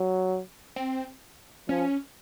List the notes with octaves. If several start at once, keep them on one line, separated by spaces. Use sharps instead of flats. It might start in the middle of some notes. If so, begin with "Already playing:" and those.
Already playing: F#3
C4
F3 C#4